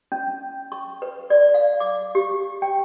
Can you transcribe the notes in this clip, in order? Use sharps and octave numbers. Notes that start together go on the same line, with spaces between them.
C#4
C#6
B4
D5
F5
D6
G4
G5